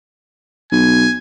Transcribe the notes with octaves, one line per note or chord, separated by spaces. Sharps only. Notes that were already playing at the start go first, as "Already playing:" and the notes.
B1 G#5